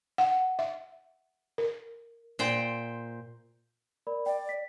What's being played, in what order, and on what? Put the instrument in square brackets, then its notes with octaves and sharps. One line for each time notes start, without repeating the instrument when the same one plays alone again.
[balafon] F#5
E5
A#4
[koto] A#2 C5 G5
[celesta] A#4 D5 B5
[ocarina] D5 [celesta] G5
[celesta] B6